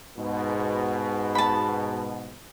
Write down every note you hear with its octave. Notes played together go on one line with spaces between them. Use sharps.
G#2 B2
A5 B5